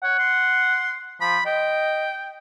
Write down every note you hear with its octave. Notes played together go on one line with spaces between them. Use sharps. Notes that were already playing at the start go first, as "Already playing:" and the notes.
C#5 F#5
C6
F3 B5
D#5 G5